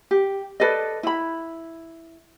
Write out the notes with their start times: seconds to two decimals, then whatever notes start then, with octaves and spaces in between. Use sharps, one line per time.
0.11 G4
0.60 A4 B4 D5 D#5
1.03 E4 B5